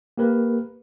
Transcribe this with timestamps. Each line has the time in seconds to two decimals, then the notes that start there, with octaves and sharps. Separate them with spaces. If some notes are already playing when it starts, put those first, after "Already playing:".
0.18 A#3 G4 A#4 B4